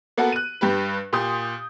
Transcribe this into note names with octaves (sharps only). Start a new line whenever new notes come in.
A#3 B3 F#4 A4
F#6 D#7
G2 G4 B4
A#2 G4 C6 D#6 G6